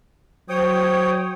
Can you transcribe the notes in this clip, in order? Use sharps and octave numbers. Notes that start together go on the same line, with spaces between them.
F#3 C5 C#5 G5 D#6